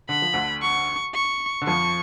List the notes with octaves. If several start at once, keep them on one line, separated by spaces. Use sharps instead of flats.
D3 B5
F3
D2 D3
C#6
C#6
D3
F2 F3 C#6